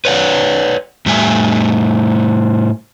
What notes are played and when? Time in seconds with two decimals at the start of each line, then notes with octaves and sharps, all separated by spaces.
0.05 B4 C#5 D5 F#5
1.06 A2 G3 A3 E5 G#5